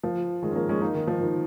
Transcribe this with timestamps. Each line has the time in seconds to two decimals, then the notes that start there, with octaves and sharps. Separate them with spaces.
0.03 F3
0.42 D#3 G#3
0.51 C#4
0.55 F3 A#3
0.69 G#3 C#4
0.81 A#3 D#4
0.94 D#3
1.07 F3
1.21 D#3